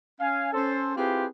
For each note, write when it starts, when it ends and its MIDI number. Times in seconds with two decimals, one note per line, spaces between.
0.21 0.53 61
0.21 0.53 77
0.21 0.53 80
0.53 0.92 61
0.53 0.92 69
0.53 0.92 72
0.96 1.27 60
0.96 1.27 64
0.96 1.27 65
0.96 1.27 67
0.96 1.27 68
0.96 1.27 71